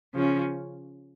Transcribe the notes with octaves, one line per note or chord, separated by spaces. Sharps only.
C#3 F3 C#4